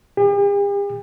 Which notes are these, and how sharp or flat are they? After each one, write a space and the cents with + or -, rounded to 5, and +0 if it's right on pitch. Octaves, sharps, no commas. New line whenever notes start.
G4 +45